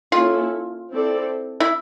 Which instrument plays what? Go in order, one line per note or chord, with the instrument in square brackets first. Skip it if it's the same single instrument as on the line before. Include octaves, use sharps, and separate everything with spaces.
[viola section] A#3 C#4 E4 A4 [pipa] F4
[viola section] C4 E4 A4 D5
[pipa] E4